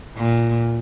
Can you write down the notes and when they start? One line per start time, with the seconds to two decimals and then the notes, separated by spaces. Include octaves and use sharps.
0.16 A#2